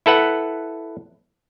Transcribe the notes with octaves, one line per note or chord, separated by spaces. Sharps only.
E4 A4 B4 F#5